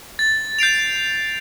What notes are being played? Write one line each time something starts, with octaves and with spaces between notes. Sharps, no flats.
A6
G6 C7 D7 F7